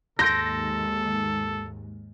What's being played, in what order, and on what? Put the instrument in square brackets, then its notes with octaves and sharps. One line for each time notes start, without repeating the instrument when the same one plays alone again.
[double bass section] D#2 G#2 G#3 [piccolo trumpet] A4 [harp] C6 G6 D7 [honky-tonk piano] A#6